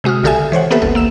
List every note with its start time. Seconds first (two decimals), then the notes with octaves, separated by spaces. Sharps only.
0.04 C3 G#3 F#4 D#6 F6
0.23 B1 D3 G4 A4 E5 G#5
0.52 E3 C5 C#5 F#5
0.71 A#3 B3 G4 A4 B4 E5
0.82 G1 C#2 A4
0.95 A#3 E6 E7